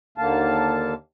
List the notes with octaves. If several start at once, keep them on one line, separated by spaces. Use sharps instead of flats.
D#2 D3 A#3 F5 A5